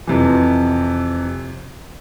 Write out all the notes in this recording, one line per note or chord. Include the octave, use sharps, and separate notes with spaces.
F2 C3 E3